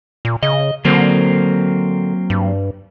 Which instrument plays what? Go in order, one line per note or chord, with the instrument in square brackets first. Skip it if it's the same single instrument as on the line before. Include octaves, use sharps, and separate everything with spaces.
[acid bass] A#2
[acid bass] C#3 [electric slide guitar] D#5
[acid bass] D3 [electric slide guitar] F#3 A#3 C4
[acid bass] G2